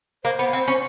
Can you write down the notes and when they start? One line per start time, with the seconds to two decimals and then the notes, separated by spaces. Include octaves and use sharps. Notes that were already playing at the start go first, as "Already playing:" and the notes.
0.24 A#3 C5
0.39 B3
0.53 C4
0.68 C#4